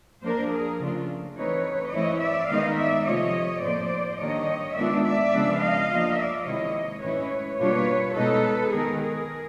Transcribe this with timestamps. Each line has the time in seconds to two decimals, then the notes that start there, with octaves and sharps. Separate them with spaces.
0.23 F3 A#3 D4 A#4 C5
0.51 G#4 A#4
0.80 C#3 F3 A3 D4 F4
1.36 E3 A3 C4 D#4 B4 C#5
1.93 E3 A3 C4 E4 C#5 D#5
2.22 D5 E5
2.50 D#3 G#3 B3 D#4 D#5 F5
2.78 D5 E5
3.06 C3 F3 A3 C4 F4 C#5 D#5
3.63 A2 F3 A#3 C5 D5
4.19 D#3 G3 A#3 D4 C#5 D#5
4.76 D#3 G#3 B3 D4 F4 D5 E5
5.04 D5 E5
5.33 C#3 F3 G#3 B3 D4
5.61 D#5 F5
5.90 F3 A#3 D4 F4
6.18 D5 E5
6.45 C3 D#3 G#3 C4 E4 C#5 D#5
7.02 A2 E3 G#3 C#4 E4 B4 C#5
7.59 B2 G3 A#3 D4 F4 B4 C#5
8.15 B2 G#3 B3 D#4 A4 B4
8.72 D#3 G#3 B3 D#4 G#4 A#4
9.01 G#4 A#4